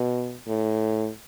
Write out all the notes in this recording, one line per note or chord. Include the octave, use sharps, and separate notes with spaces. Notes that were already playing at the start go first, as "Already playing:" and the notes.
Already playing: B2
A2